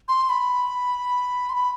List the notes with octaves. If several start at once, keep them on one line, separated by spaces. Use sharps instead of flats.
C6
B5
C6
B5